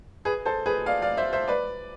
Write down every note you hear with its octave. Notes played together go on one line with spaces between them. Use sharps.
G#4 B4
A4 C5
G#4 B4
D5 F5
D5 F5
C5 E5
C5 E5
B4 D5